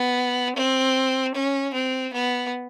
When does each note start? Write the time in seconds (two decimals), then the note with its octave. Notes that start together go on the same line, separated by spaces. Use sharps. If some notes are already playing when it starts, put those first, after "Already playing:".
Already playing: B3
0.55 C4
1.34 C#4
1.73 C4
2.13 B3